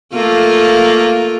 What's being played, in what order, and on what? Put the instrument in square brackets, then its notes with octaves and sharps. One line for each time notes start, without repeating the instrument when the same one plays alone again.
[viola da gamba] A3 A#3 F4